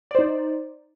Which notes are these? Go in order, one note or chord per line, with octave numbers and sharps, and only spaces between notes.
D#4 C5 D5